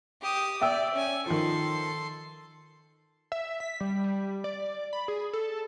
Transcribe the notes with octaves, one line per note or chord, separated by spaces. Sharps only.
G4 D#6
D5 E5 G5 E6
C#4 G#5
D#3 F3 A4 C6
E5
B6
G3
G3
D5
B5
G#4
A4